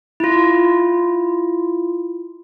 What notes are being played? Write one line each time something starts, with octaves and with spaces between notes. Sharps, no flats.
E4 F4